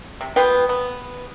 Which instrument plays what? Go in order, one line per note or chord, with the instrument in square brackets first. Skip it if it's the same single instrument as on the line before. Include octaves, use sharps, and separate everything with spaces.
[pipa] C3
B3 F4 B4 G5
B3